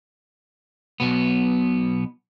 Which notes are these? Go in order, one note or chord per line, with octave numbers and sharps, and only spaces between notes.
B1 B2 B3